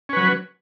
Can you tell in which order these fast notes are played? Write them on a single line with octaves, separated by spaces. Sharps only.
C#4 B4 F#3